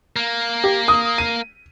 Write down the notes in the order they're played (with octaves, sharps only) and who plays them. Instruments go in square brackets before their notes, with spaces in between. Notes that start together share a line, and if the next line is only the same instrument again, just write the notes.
[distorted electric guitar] A#3
[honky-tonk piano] G4
D#6
D#7